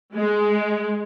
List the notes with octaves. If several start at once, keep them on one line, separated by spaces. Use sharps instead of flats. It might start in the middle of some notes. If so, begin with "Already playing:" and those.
G#3